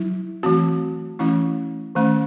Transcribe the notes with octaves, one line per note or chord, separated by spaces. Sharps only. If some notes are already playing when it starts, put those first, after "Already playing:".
Already playing: F#3 E4
E3 A3 C4 F#4
E3 A3 C#4 E4
D#3 A3 C#4